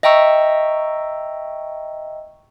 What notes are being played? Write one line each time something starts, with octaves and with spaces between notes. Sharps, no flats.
D#5 E5 G5 A#5 C#6 E6